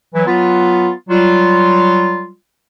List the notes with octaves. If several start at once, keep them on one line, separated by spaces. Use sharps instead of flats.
E3 F#3
F#3 B3 F4
F#3 G3 F4